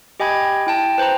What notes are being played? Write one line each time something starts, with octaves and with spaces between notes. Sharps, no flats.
G4 D#5 G5 G#5 B5 G#6
E4 G5 A5
B4 C5 G5 A#5